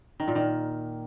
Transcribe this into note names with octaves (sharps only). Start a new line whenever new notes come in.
D#3
A#2
D#3